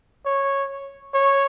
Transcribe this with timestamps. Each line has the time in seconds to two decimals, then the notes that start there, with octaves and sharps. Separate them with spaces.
0.26 C#5
1.14 C#5